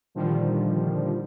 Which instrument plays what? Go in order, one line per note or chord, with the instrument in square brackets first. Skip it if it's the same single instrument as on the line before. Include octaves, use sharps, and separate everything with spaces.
[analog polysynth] A#2 D3 D#3 F3 G3